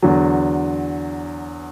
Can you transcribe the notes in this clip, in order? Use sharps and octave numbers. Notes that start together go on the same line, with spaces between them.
E2 D3 F#3